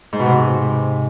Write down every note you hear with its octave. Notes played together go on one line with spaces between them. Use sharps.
G#2
B2
C3